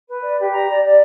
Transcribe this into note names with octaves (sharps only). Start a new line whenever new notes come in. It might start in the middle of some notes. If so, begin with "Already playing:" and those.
B4
D5
G4
A#5
D5
D5